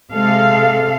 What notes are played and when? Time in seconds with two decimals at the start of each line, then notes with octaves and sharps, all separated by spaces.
0.12 C3 G#3 A4 F5